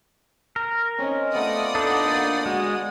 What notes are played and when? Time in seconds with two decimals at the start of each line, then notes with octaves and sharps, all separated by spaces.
0.56 A#4
0.99 C4 C#4 D#4
1.34 A3 B3 F4 D5 F#5 D#6
1.75 D4 D#4 A4
2.07 D3 A#3
2.46 G#3 F#4